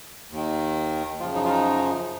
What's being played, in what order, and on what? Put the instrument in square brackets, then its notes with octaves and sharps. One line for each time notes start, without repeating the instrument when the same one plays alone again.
[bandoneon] D#2 D#3
F#2 C#3 F3 F4
D#4
F4
D#4